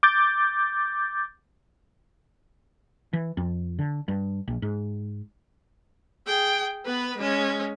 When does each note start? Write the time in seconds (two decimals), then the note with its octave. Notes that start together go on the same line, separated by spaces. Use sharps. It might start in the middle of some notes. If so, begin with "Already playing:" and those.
0.03 D6 G6 A6
3.13 E3
3.37 F2
3.79 D3
4.08 G2
4.48 A#1
4.62 G#2
6.27 G#4 G5
6.85 B3 B4
7.17 G#3 C#4